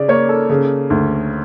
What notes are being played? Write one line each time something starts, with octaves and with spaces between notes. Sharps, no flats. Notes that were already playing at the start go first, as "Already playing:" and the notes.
Already playing: C#3 D5
A#3 C#5
A4
C#3
D2